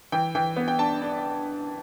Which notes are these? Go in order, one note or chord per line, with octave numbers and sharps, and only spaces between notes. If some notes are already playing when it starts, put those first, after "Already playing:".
E3 G5
E3 G5
B3
G5
D4 A5
D4